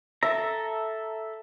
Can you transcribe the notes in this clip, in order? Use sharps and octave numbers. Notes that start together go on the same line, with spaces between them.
A4 E5 A#5